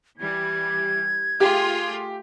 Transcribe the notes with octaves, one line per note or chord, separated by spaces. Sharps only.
E3 G3 G#6
A3 F4 G4 G#4